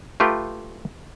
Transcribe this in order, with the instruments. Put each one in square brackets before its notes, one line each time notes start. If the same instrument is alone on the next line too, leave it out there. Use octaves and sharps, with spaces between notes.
[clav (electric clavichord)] A3 F4 G4 B4